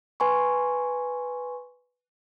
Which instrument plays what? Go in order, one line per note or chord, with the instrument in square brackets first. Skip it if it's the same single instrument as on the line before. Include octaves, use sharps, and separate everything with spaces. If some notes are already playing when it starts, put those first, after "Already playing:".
[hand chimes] B4 G#5 C6 C#6